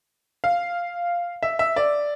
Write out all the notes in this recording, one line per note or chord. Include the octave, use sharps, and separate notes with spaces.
F5
E5
E5
D5